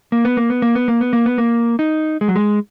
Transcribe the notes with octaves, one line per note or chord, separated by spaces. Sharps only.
A#3
B3
A#3
B3
A#3
B3
A#3
B3
A#3
B3
A#3
D#4
G#3
F#3
G#3